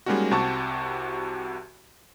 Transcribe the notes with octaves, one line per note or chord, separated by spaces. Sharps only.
G3 G#3 A#3 C#4 D#4 F#4
C2 C3 F#4 G4 A5 C#6